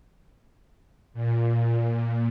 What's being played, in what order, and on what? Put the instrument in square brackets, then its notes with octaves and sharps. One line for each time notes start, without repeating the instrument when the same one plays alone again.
[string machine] A#2